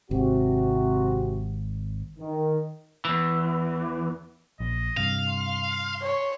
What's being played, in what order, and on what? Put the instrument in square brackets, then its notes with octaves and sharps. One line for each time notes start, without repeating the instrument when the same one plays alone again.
[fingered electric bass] G#1 [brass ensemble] C3 F#4
[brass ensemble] D#3
[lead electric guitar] E2 E3
[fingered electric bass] A#1 [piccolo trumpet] D#5
[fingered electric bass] G2 C3 [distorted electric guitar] F5
[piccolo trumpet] C6
[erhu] C#5